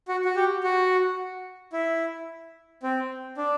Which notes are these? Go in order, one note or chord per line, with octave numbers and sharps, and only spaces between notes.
F#4
F#4
G4
F#4
E4
C4
D4